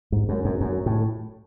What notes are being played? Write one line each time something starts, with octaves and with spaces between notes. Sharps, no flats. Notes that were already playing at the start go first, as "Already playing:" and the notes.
G#2
F#2
F#2
F#2
A2